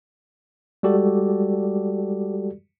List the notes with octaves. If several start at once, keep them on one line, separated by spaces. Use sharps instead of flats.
G3 G#3 F#4 G4 A4 D5